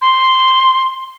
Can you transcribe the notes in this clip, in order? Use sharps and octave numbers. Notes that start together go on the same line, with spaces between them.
C6